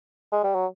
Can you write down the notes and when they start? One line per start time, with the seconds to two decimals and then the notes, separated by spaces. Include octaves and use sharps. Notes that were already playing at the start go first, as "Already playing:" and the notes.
0.32 G#3
0.44 G3
0.55 F#3